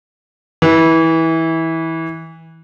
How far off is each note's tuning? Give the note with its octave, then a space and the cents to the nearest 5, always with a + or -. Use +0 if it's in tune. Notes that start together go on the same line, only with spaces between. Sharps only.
E3 -20